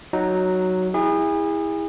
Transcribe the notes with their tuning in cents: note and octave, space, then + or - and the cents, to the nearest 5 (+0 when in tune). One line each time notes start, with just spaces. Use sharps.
F#3 +0 D#4 +0
E4 -20 G#4 -35